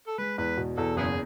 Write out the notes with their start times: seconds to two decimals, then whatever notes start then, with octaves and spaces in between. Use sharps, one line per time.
0.08 A4
0.18 G#3 B4
0.38 E2 B4
0.57 B2
0.77 E2 A4
0.97 F#1 B3 E4 G#4